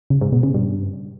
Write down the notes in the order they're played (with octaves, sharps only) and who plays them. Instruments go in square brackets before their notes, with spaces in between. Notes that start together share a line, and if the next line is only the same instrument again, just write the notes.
[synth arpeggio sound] C#3
G#2
B2
C#3
G2